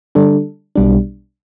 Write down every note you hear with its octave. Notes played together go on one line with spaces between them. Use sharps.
D3 G3 D4 A4
B1 B2 G3 D4